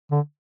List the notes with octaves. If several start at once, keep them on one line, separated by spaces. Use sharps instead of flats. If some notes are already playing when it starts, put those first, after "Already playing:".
D3